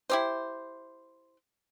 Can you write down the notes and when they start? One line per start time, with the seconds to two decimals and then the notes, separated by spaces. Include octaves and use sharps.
0.10 E4 G4 C5